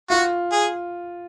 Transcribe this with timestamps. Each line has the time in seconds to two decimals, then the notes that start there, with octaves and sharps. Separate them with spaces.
0.10 F4 F#4
0.52 G#4